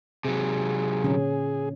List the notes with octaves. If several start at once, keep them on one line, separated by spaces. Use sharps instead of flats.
C3 F#3 G#4
A#2 D3 C#4